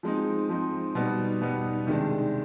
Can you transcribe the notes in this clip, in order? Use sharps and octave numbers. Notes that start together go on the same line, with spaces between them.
F3 G#3 C4 D#4
F3 G#3 C4 D#4
B2 G3 B3 D#4
B2 G3 B3 D#4
C3 D#3 G#3 D4